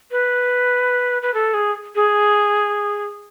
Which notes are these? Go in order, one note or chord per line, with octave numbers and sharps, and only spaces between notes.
B4
B4
A4
G#4
G#4